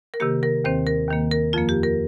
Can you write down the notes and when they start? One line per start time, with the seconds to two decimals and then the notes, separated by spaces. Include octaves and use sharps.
0.14 A#4
0.20 C3 D#3 A#3 G4
0.43 A#4
0.64 D#2 D#3 C4 C5
0.87 A#4
1.09 D#2 D#3 A#3
1.31 A#4
1.53 F2 F3 A#3 F4
1.69 G4
1.83 A#4